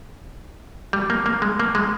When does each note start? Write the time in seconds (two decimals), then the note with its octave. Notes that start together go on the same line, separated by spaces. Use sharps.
0.93 G3
1.10 A#3
1.26 A#3
1.42 G#3
1.60 A#3
1.75 G#3